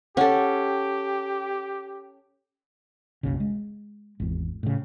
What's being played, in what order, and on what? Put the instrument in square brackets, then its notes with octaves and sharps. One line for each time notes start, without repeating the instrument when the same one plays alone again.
[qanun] C#4 A4 [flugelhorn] G4 [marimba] F#5
[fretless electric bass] F#1 B1 C#3
G#3
G#1 E2
A2 C#3